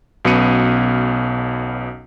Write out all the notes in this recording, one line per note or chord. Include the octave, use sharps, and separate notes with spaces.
B1 B2 B3 C#4 C#7 D#7